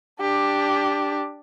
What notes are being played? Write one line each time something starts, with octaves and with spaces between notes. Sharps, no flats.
D4 G4